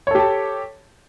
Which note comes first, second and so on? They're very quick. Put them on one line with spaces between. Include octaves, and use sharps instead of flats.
C#5 A4 G4 A5